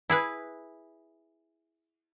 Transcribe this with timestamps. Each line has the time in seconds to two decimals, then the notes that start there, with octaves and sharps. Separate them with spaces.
0.10 E4 G#4 B4